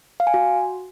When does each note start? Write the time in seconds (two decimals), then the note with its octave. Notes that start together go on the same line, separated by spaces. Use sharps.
0.20 F5
0.27 G#5
0.34 F#4